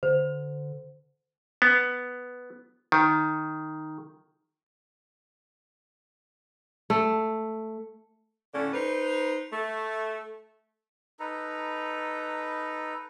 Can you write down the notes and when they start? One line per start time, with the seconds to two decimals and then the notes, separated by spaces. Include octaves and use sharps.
0.03 D3 C5
1.62 B3
2.92 D#3
6.90 A3
8.54 A2 D3 C#4
8.74 D#4 B4 C5
9.52 A3
11.20 D#4 A4 B4 A#5